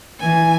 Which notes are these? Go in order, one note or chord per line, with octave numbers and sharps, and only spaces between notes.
E3 G#5